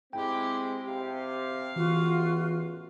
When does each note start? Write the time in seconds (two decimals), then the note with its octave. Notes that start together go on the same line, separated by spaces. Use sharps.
0.13 G#3 C4 E4 G4 G5
0.85 C3 G4 F5
1.76 A1 E2 E3 F4 F#4